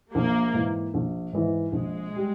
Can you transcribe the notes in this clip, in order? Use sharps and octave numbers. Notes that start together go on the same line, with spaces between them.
A#1 A#3
G#2 E3
A#1
G#2 E3
A#1 G#3
G3